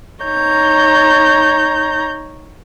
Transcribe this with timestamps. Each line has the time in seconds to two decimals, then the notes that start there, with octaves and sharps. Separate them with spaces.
0.23 D#4 C#5 A#5 G6